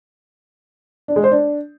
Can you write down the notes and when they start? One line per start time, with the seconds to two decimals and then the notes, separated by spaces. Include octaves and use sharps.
1.08 D4
1.16 G#3
1.24 C5
1.31 D4